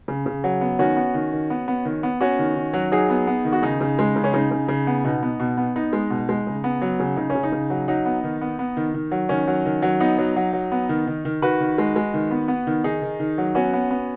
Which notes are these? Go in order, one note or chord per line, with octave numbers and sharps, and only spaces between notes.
C#3
C#3
F#3
B3
D#3 C#4 F#4
B3
D#3
D#3
B3
B3
D#3
B3
B3 C#4 F#4
D#3
D#3
F#3
F#3 D#4 G#4
B3
B3
D#3
F#4
C#3 D#4
C#3
G#3
C#3
C#4
C#3 D#4
C#3
C#3
B3
B2 D#4
B3
B2
B3
B3 D#4
G#3
B2
G#3
C#3
B3
F#3
C#3
C#3 D#4
C#4
C#3
D#4
C#3
F#3
F#3 D#4
B3
D#3
B3
B3
D#3
D#3
F#3
D#3 C#4
F#3
D#3
F#3
B3 D#4
F#3
F#3
F#3
B3
D#3
D#3
D#3
D#3 F#4 B4
D#3
G#3
G#3
D#3
B3
B3
D#3
D#3 D#4 G#4
D#3
D#3
F#3
B3 C#4 F#4
B3
B3